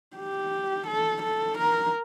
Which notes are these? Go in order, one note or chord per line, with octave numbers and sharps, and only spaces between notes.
G4
A4
A4
A#4